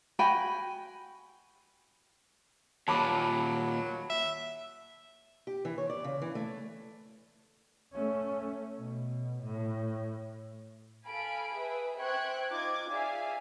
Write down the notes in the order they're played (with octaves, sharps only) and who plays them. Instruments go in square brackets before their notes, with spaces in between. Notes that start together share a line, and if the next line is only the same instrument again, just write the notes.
[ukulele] F#4 G5 G#5 B5
[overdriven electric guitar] D#2 A#2 [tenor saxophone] F#3 [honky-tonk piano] A5 B5 D6
[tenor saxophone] E5
[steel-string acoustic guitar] G4
E3
C#5
D5
C#3
E3
A3
[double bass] A3 C#4
B2
A2
[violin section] A4 F5 G#5 B5 D7
G#4 B4 E5
C5 E5 G5 C#6 F#6 G#6
D#4 F4 D6 G#6
G#4 D5 E5 F5 G#5